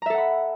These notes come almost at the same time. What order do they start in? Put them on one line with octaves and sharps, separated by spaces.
A#5 E5 A4 F#5 B5